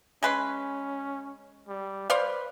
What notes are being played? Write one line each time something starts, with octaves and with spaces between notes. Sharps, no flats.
G#3 C#4 B4 C6
G3
B4 C5 D5 F5